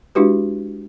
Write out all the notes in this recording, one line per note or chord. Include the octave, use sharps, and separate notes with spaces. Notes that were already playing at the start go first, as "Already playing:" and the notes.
G#3 D4 E4 F#4 G4 B4